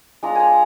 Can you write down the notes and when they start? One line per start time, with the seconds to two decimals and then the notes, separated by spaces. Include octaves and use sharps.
0.23 G#3 D4 F4 A#5
0.35 G#5 A#5